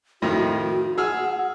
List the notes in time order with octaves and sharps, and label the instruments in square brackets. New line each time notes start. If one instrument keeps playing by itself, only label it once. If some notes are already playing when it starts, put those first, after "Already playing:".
[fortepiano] F2 A2 D#3 [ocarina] F#4
[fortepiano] G#4 E6 F6 [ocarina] F#5